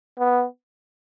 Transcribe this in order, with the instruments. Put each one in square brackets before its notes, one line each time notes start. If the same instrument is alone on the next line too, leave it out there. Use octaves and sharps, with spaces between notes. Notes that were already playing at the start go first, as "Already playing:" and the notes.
[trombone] B3